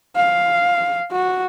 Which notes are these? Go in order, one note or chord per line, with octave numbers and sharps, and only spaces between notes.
F5
F#4